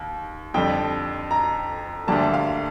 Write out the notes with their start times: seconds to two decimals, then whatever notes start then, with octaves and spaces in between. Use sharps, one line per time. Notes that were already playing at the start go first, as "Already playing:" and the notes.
Already playing: D#2
0.54 F2 D3 G3 G5
1.31 A#5
2.07 D2 D3 G3 A#3 A5
2.33 F5